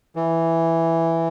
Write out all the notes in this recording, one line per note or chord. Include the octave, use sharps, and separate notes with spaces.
E3